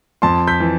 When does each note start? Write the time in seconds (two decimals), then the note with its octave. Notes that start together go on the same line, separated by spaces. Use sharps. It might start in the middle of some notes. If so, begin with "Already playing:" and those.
0.22 F2 A5 C6
0.47 G6 B6
0.60 E3